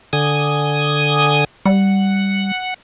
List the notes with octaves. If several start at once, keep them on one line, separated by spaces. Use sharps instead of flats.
D3 G#5 D#6
G3 F#5